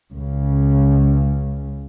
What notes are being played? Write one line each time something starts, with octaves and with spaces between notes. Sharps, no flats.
C#2 C#3